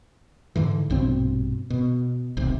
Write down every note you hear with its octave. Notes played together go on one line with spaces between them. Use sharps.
G#2 D3 E3
A#1 G2 B2 C4
B2
D1 B1 C3